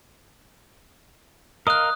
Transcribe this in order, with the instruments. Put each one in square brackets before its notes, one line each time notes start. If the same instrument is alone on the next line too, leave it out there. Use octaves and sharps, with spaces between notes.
[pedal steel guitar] A#4 D#5 F5 [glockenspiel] D#6 F#6